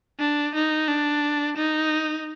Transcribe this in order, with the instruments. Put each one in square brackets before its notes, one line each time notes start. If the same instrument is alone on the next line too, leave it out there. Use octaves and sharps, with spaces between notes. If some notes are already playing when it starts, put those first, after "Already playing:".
[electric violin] D4
D#4
D4
D#4